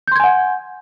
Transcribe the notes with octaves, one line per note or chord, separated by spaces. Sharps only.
F#5 G#5 C6 G6 G#6